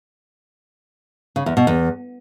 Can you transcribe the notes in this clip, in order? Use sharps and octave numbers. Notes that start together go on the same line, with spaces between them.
C#3
E2
B2
E2